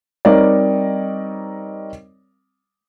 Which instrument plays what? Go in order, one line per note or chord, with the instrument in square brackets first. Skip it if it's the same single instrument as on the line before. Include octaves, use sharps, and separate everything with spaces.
[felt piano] G3 C4 D#4 A#4 C#5 D5